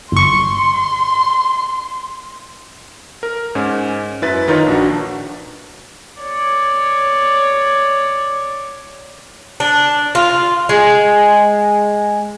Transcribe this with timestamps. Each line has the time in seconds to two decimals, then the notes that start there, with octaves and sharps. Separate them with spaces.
0.12 G1 C6 C#6
3.23 A#4
3.55 G#2 C#4
4.22 F#2 E4 B4 A6
4.48 D#3 D#4 F4 A#4 B4 C#5
4.66 A#1 D4 F#4
6.21 C#5 D5
9.60 D4
10.15 F4
10.69 G#3